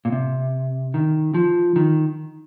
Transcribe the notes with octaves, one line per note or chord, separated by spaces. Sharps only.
A#2
C3
D#3
F3
D#3